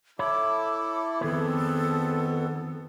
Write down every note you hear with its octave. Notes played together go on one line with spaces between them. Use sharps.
E4 A4 C#5 B5 D6
F2 D#3 B3 G#4 A4 B4